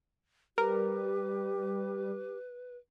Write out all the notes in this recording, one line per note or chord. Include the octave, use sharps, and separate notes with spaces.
G3 G4 A#4 B4